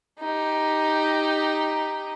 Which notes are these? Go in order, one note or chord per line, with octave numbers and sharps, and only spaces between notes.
D#4 G4